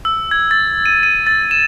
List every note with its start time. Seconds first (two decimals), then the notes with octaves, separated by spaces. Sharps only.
0.05 E6
0.31 G#6
0.51 A6
0.86 D#7
1.03 D#7
1.27 A6
1.51 E7